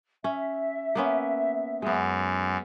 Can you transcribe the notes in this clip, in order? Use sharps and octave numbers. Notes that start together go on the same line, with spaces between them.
C#4 E5
A#3 B3 C#4
F#2 G#3 B3